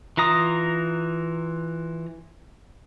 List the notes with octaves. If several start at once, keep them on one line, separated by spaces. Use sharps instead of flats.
E3 F4 A#5 D#6